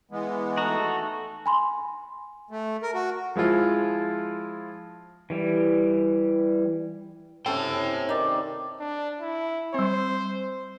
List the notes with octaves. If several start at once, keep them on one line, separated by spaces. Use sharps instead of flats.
E3 G#3 B3
A3 D#4 F#4 A4
G#5 B5 C6
A3
A#4
F#4
F3 G#3 E4 F4
E3 G3
C3 C#4 A4 C#5 G5
D#3 D5
D4
E4
G3 C4 C5